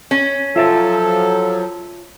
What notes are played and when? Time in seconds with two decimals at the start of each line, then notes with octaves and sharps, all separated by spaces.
0.11 C#4
0.56 F3 F#3 F4 A4 E5 A5